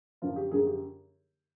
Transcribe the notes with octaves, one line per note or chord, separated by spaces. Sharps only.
F#2 D3 F3 F4
G4
F#2 D3 F3 G#4
G4